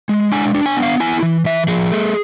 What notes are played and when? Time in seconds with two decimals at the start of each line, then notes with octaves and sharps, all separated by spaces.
0.09 G#3
0.32 D4 G#5
0.54 D4
0.66 G#5
0.77 B3
0.83 F5
1.00 E4 G#5
1.23 E3
1.45 E3 E5
1.68 F3 G#4
1.91 A3